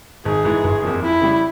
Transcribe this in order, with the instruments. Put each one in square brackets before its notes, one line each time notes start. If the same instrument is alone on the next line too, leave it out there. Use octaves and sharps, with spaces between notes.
[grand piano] G#1 [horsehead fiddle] G#4
[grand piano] G#2 E3
G1
F2 C3 F3 A#3
[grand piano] F2 [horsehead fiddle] E4
[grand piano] C#3 G3